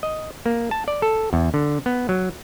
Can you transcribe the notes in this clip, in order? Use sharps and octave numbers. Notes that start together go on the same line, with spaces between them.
D#5
A#3
A5
D5
A4
E2
D3
B3
F#3